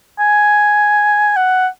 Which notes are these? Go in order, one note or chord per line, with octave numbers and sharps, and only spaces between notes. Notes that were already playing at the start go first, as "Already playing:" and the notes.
G#5
F#5